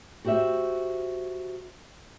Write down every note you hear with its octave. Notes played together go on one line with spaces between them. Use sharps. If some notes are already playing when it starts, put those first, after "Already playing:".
F#4 G4 C5 D#5 E5